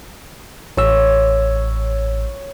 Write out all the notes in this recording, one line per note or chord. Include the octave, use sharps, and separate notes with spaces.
A1 C#5 E6